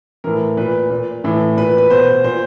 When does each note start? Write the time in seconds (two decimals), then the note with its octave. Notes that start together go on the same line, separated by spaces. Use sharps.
0.24 A2 E3 A#4
0.57 A#2 B4
0.91 A#2
1.24 A2 E3
1.57 A#2 B4
1.78 B4
1.90 B2 C5
2.24 A#2 C5